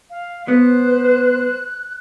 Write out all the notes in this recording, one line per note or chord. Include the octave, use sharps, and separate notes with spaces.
F5
B3 B4 C5 F#6